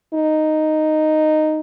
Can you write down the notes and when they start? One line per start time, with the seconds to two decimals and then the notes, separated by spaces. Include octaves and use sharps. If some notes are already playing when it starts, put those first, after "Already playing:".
0.14 D#4